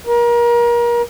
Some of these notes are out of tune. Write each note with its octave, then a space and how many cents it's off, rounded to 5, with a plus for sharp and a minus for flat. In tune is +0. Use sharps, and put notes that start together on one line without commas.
A#4 +30